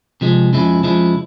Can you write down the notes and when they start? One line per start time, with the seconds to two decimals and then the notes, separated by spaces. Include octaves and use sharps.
0.21 C3 F3 G#3
0.53 F2 C#3 F3 G#3 E4
0.83 F2 C#3 F3 G#3 E4